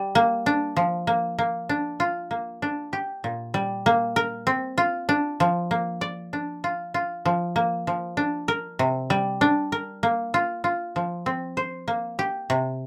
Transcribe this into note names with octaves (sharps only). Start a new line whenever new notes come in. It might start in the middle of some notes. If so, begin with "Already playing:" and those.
Already playing: G3
A#3
D4
F3
A#3
A#3
D4
F4
A#3
D4
G4
A#2
G3
A#3
A#4
C4
F4
D4
F3
A#3
D5
D4
F4
F4
F3
A#3
F3
D4
A#4
C3
G3
D4
A#4
A#3
F4
F4
F3
C4
C5
A#3
G4
C3